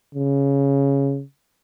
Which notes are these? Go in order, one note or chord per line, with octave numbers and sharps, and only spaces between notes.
C#3